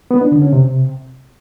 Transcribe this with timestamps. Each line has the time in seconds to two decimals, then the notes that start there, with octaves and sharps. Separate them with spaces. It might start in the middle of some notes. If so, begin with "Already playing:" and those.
0.11 B3
0.21 D4
0.32 D3
0.42 C#4
0.52 C3